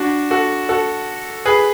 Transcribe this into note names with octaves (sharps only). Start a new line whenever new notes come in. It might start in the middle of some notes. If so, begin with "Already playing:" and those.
Already playing: D4 F#4
F#4 A4
F#4 A4
G#4 B4